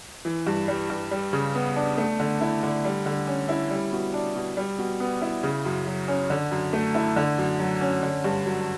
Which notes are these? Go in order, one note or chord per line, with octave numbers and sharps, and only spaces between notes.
E3
G2
G3
G2
G3
C#3
B3
D4
A3
D3
E4
D3
G3
D3
C#4
E4
G3
B2
D4
B2
G3
B2
B3
E4
C#3
F#2
F#3
C#4
D3
F#2
A3
E4
D3
F#2
F#3
C#4
D3
G2
F#3